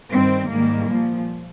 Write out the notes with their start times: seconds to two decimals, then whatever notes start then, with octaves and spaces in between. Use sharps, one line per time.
0.10 G2 D#3 G3 C4
0.49 G#2 D#3 G3 A#3
0.88 A#2 F3